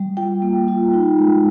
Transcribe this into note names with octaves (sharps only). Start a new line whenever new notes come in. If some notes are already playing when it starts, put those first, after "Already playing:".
Already playing: G3
F4 G5
A#3
F4
D#4
G#3